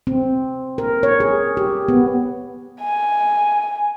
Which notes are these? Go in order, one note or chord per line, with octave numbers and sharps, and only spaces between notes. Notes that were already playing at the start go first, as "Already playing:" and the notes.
C4
A#4
C#5
G#4
G4
B3
G#5